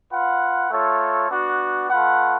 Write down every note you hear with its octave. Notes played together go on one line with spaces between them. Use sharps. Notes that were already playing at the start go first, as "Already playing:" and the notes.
F4 B4 F#5
A3 F4 A4 C#5
B3 D4 F#4
A3 F4 B4 F#5